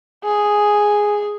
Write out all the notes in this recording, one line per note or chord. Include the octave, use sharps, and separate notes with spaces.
G#4